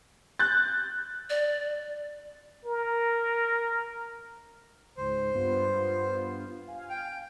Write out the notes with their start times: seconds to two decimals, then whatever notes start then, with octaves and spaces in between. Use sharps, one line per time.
0.39 F#6 G6 A6
1.30 D5
2.65 A#4
4.97 C#2 G#2 C5
5.34 G2 B3 F4
6.68 F5 G#5
6.90 G5